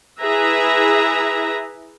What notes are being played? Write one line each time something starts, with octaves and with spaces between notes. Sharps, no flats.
E4 G#4 B4 E5 A#5